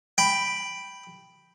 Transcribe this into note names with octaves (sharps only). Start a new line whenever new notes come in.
G5 B5